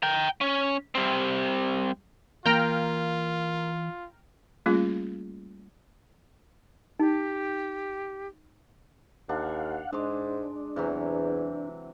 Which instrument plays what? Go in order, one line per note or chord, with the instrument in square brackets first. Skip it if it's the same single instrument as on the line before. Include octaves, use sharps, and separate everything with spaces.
[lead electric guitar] G5 A#5
C#4
G3 C4
[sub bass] E3 [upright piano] A#3 [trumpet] F4 [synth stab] G5 A#5 F6
[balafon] G3 A3 A#3 C#4 F4 G#4
[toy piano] D#4 [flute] G4
[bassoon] D#2 [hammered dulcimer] D4 [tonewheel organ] F5 F#5
[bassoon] G#2 [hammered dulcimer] G#3 D6 [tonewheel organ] D4
[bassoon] E2 [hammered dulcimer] C3 E3 F#3